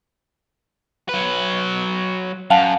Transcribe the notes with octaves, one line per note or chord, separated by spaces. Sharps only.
F#3 B4
F#2 F5 F#5 A5